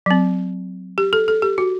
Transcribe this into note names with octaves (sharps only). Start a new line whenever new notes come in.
F#3 C4
G4
A4
A4
G4
F#4